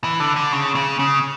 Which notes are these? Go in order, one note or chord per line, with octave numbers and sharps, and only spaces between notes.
E3
D3
D3
C#3
C#3
C#3